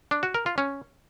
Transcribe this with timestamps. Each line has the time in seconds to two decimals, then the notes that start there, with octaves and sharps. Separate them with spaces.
0.11 D4
0.23 F#4
0.34 A#4
0.46 F4
0.58 C#4